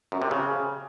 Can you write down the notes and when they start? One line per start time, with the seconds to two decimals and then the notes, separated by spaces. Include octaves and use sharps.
0.12 F#2
0.22 C3
0.31 C#3